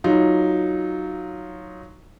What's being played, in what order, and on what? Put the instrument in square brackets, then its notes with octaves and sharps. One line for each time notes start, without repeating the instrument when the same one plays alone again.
[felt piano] F#3 D#4 F4